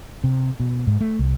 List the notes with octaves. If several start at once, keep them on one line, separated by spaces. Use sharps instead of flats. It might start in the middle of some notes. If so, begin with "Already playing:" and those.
C3
B2
G#2
A3
C2